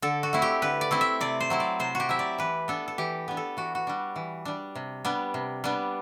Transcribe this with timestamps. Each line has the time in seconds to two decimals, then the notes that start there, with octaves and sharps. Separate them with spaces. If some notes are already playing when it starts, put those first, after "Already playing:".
0.02 D3 A4
0.23 F#4
0.33 A3 C4 E4
0.42 G4
0.62 D3 B4
0.81 D5
0.91 A3 C4 E4
1.01 E5
1.21 C3 D5
1.41 C5
1.50 F#3 C4 E4
1.60 D5
1.80 C3 C5
1.95 F#4 G4
2.09 F#3 C4 E4 E5
2.19 D5
2.38 E3 B4
2.68 B3 D4 A4
2.88 A4
2.98 E3 G4
3.28 B3 D4
3.37 A4
3.57 E3 F#4
3.75 F#4
3.87 G3 D4
4.16 E3
4.45 G3 D4
4.75 C3
5.05 G3 B3 D4
5.34 C3
5.64 G3 B3 D4